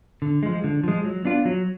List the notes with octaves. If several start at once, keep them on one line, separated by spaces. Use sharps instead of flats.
D3
F3 G#3
D3
F3 G#3
F#3
B3 D4 F4
F#3